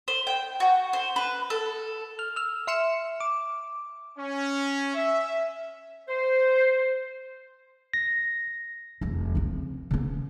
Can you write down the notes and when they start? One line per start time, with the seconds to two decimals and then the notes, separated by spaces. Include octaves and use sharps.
0.08 C5
0.27 G5
0.60 F#4
0.93 C5
1.16 B4
1.50 A4
2.19 F6
2.36 E6 F6
2.67 E5 C6 F6 C#7 E7
3.20 D6
4.18 C#4
4.94 E5
6.09 C5
7.94 A#6
9.01 F1 E2
9.35 C#3 C4
9.91 C#3 B3